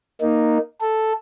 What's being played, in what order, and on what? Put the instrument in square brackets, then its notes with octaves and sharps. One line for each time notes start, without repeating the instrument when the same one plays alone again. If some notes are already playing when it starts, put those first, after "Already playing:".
[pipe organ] A#3 D#4
A4